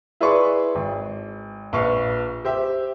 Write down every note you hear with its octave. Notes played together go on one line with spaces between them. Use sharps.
E4 G#4 B4 D5 C6 C#6
G#1
A#1 B4 F5 C#6
G4 C5 E5